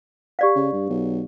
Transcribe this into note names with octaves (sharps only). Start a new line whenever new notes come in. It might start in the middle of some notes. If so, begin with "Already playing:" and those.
G4 D5 F5
C#3
G2
B1